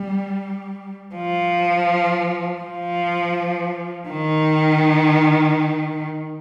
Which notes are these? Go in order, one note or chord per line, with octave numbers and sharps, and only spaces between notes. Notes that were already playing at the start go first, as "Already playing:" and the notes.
Already playing: G3
F3
F3
D#3